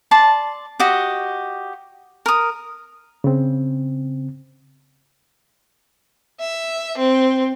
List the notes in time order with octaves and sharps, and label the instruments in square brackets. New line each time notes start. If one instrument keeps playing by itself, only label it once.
[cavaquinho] D5 A5 C6
F#4 G4 D#5
A#4 D#6
[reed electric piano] C#3 C4
[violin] E5
C4